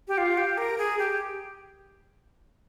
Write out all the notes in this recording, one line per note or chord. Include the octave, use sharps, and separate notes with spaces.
G4
F4
G4
A#4
G#4
G4